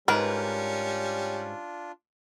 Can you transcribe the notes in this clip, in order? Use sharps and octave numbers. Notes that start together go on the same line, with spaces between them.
G#2 G3 C#4 D4 F4 A#4 B4